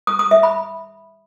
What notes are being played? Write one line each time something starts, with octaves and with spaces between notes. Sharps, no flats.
D#6
D#6
E5
B5